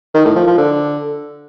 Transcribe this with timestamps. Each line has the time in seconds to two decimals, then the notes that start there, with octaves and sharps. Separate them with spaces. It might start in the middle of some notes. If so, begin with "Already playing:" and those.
0.14 D#3
0.25 A2
0.36 F3
0.47 F3
0.58 D3